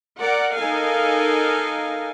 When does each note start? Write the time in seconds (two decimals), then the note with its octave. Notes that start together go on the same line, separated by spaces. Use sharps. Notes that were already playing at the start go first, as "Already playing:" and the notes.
0.20 A#4 D5 F#5
0.57 D#4 A4 A#4 F5 G#5